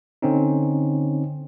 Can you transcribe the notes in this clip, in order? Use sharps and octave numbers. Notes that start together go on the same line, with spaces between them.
D3 C4 C#4 D#4